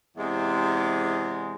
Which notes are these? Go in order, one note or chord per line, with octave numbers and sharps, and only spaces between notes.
E2 C3 G#3